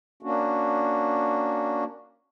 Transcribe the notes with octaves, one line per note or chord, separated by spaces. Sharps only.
A#3 C#4 D4 F#4